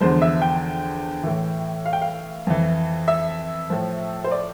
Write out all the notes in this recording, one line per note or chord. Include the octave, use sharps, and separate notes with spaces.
E2 D3 F3 C5
E5
G5
A2 E3
F5
G5
F5
F2 E3
E5
A2 F3
C5
D5